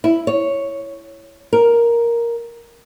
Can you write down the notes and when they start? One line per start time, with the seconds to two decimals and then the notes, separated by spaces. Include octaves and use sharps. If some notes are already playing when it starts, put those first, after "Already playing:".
0.04 E4
0.27 C#5
1.53 A#4